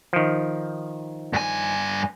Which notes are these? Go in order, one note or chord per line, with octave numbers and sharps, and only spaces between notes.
D#3 F3
G2 G#5